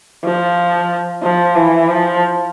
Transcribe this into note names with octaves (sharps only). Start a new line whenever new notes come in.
F3
F3
E3
F3